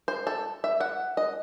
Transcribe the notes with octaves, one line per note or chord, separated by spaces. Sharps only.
C5
A4
E5
F#5
D#5